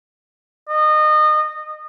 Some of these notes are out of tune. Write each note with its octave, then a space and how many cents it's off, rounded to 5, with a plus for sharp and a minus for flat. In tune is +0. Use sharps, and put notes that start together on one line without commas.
D#5 -25